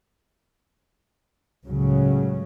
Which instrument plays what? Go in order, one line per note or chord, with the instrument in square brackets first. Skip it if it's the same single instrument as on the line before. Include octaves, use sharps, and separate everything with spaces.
[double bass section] C#2 A2 C#3 F#3